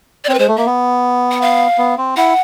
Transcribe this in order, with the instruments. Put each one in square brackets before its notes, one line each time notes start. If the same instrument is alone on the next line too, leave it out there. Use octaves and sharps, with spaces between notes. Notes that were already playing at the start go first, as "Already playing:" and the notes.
[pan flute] D5
[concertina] C4 [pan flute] C#5
[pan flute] B4
[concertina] G#3 [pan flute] C5
[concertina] A3
[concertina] A#3 [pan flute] E5
[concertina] B3
[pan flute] F#5
F5
[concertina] B3
C4
[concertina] E4 [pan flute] F#5